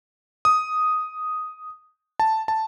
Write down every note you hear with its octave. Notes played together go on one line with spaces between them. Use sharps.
D#6
A5
A5